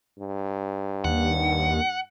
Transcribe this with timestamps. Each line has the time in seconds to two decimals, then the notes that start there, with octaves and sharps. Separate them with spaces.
0.19 G2
1.04 D#2 F#5